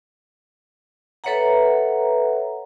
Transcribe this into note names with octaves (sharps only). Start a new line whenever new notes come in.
A4 B4 C#5 E5 F#5 A#5